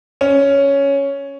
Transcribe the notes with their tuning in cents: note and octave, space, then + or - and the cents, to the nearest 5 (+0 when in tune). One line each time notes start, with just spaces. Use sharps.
C#4 +5